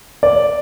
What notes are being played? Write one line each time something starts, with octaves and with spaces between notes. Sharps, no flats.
D5